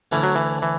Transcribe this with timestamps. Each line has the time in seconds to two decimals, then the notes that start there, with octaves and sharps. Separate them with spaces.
0.12 D2 D3 E3 A3 C#4 E4
0.23 F#3
0.35 E3
0.62 E3